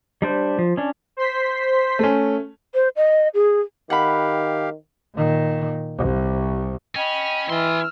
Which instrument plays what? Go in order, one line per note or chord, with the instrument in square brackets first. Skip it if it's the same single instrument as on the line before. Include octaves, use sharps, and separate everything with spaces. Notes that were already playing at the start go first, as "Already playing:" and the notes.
[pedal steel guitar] G3 D4 C5
F3
C#4 D4
[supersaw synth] C5 C6 B6
[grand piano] A3 C#4
[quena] C5
D#5
G#4
[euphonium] D#3 [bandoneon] G4 F5 [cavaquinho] F#5 B5
[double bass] A#2 D#3
C2
[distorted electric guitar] C#4 [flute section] D#5 G5 B5
[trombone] E3 [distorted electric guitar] E4 C6 [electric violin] E6 F6